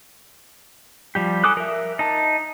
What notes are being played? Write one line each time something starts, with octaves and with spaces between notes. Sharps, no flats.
F3 G3 G4
A4 G#5 D6 D#6 F#6
A#4 E5
D#4 A5